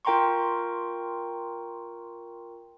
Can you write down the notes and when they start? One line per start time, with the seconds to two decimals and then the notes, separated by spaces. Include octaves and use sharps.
0.05 F4 A#4 G5 A#5 C6 C#6